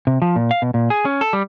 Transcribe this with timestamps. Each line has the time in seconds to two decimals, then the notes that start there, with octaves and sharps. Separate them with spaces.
0.07 C3
0.22 F3
0.36 A#2
0.51 F5
0.62 B2
0.74 A#2
0.90 G#4
1.05 C#4
1.21 A4
1.33 G3